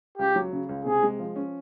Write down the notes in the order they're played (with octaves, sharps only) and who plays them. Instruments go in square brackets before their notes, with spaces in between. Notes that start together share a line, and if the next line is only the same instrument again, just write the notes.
[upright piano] C#2 [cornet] G4
[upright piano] F#3
C#3
C#2
[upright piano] C3 [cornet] G#4
[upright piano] G#3
F3
C#4